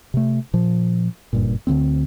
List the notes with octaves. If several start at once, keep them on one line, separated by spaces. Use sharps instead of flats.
C3 A3
A#2 F3
F#1 G2 A#2
D2 D3 A#3 C4